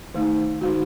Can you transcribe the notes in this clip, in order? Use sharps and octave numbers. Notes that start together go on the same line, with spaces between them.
D#3 A3 D#4
D#3 G#3 D#4 F#4